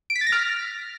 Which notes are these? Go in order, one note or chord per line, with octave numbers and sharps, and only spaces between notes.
D7
B6
A6
A#6
F6